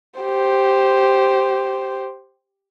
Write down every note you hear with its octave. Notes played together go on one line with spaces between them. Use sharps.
G4 C5